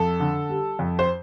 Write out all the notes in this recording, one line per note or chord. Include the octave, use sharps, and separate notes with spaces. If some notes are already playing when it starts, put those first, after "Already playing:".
Already playing: F2 A4
D3
G3
F2
C5